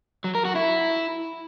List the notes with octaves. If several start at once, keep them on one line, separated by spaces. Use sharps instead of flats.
F#3
A#4
F#4
E4